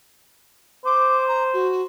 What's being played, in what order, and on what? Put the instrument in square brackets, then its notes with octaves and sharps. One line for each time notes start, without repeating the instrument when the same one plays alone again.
[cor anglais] C5 [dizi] D6
[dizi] A#5
F#4